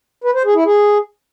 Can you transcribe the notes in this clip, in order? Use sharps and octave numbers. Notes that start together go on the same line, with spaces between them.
B4
C5
G#4
E4
G#4